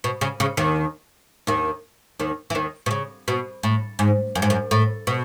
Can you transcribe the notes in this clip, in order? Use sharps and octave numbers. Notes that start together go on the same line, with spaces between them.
B2
C#3
C#3
D#2 D#3
D#2 D#3
D#2 D#3
E3
D#2 D#3
B2
C#3
B2
A2
G#2
F#2
G#2
F#2
A2
B2